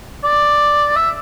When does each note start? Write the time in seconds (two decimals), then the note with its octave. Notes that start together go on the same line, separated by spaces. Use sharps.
0.24 D5
0.96 E5